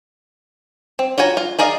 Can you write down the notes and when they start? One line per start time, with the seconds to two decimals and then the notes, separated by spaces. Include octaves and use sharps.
0.99 C4
1.18 F4 F#4 C#5 G#5 A#5
1.37 F4
1.59 G#4 A#4 D5 D#5 F5